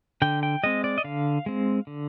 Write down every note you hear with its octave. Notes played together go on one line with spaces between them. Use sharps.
D3 G5
G5
G#3 C4 D#5
D5
D#5
D3 F5
G#3 C4
D3